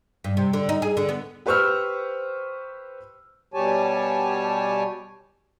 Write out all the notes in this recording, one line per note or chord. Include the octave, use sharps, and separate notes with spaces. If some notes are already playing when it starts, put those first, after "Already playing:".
G2
C3
D3
D#4
G#4
D3
B3
G4 B4 C5 C#6 E6 F6
B2 G3 G4 C#5 G#5 A5